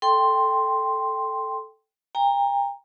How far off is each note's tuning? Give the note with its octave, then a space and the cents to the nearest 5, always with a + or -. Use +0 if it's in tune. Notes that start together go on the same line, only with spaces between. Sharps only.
A4 +0 G5 +0 C6 +0
G5 +40 A#5 +0